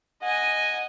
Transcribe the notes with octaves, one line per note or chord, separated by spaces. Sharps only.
D#5 F#5 G#5